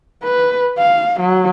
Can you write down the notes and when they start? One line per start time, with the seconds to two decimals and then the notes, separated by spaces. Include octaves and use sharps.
0.24 B4
0.78 F5
1.20 F#3